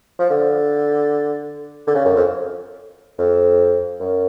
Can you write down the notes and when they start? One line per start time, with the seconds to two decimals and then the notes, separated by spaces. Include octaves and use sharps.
0.19 F3
0.30 D3
1.87 D3
1.95 C#3
2.05 F#2
2.15 F2
3.18 F2
4.00 F#2